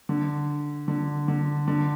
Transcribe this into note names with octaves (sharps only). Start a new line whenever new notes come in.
D3
D3
D3
D3